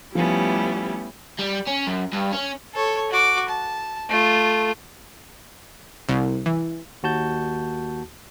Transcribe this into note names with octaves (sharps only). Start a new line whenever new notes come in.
F3 G3 A3 B3 C#4 E4
G3
C#4
F#2
G2
C#4
A4 C#5
F#4 D6
A5
A3 F4
C2
E3
D#2 F#4 A5 G6